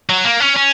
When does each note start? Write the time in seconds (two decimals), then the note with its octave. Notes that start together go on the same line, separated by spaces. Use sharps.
0.10 F#3
0.25 A#3
0.40 C#4
0.56 C#4